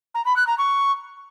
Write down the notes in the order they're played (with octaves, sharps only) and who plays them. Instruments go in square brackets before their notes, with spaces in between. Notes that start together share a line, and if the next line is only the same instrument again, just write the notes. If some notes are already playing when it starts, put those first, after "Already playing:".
[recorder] A#5
B5
F#6
A#5
C#6